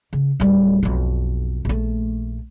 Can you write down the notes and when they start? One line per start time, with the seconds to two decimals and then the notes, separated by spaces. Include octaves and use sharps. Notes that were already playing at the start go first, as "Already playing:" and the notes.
0.13 C#3
0.40 D1 G3
0.83 B1 F2
1.65 A#1 A3